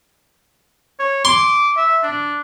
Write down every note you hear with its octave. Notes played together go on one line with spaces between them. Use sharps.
C#5
C6 D6
E5
D4